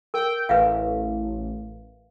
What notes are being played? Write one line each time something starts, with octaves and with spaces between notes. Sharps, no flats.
A#4 G5
A1 B4 E5 F5